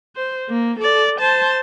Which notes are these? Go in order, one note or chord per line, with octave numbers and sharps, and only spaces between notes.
C5
A#3
A4 D5
C5 A5